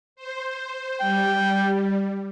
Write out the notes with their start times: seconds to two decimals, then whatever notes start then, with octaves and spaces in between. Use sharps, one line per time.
0.16 C5
1.00 G3 G5